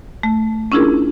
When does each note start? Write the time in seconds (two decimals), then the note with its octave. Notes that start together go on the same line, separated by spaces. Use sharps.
0.23 A3
0.72 C#4 D4 E4 F4 G#4 A#4